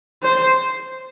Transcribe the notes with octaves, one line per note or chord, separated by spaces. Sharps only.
C5